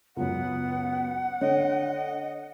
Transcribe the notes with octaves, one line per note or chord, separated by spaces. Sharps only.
C#2 F#2 B3 F#5
D3 C#5 D#5